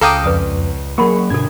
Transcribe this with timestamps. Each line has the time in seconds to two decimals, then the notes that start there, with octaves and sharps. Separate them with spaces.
0.01 C#2 A4 F5 G5 A#5 D6 D#6
0.24 F2 B4 D5 D#6
0.98 F#3 A#3 G#4 A#4 F#5 B5 C#6
1.30 G2 B2 D3 D4 A4 G#6